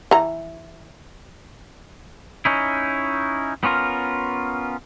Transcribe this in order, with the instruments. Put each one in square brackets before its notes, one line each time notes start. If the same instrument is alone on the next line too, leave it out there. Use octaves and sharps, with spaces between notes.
[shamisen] E3 A#5
[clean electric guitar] C#4 D#4 E4
B3 C#4 F4 A#4